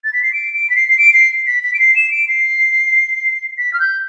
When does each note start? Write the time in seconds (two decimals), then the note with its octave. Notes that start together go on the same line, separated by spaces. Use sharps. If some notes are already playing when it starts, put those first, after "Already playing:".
0.04 A6
0.13 B6
0.23 C7
0.33 D7
0.54 D7
0.70 B6
0.76 C7
0.89 C7
0.98 D7
1.14 C7
1.47 B6
1.63 B6
1.74 D7
1.79 C7
1.96 E7
2.11 D7
2.28 C7
3.58 B6
3.73 F6
3.80 G6